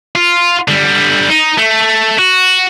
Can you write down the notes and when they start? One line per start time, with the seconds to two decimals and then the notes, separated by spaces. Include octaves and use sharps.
0.16 F4
0.68 D3 G3
1.30 D#4
1.58 A3
2.19 F#4